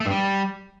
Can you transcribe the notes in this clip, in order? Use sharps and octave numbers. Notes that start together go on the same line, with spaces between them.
A3
G2
G3